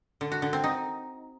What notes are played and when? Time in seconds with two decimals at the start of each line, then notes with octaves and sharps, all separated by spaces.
0.21 D3
0.32 F#4
0.42 D3
0.53 C4
0.64 D#4